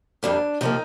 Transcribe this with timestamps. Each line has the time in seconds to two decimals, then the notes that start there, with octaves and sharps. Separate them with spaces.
0.23 F2 C3 G3 A#3 D4
0.61 C3 F3 A#3 D#4